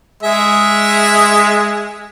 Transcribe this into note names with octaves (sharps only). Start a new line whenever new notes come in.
G#3 G#4 E5